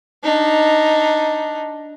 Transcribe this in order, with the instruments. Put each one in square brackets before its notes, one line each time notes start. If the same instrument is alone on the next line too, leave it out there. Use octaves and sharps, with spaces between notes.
[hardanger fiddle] D4 D#4